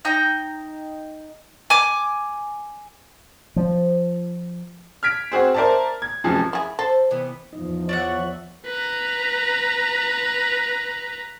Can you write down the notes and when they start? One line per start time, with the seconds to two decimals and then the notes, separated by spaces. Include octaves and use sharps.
0.05 D#4 G5 A#5
1.70 G#5 D6
3.56 F3
5.03 F6 G#6 B6 D7
5.32 C4 F#4 G#4 C5
5.54 A#4 C5 D5 E5 A5
6.02 G#6
6.24 F1 F#2 F3 G#4 A5
6.53 E4 G#4
6.79 A4 C5
7.10 C3 E3 B3
7.53 E2 F3 D#4
7.89 C#5 D5 E5 F#5
8.66 B4 A#5